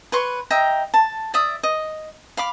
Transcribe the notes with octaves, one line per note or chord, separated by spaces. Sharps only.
B4 C#5 C6 C#6
D#5 E5 G5 A#5
A5
D5 E5 D#6
D#5
F5 B5 D6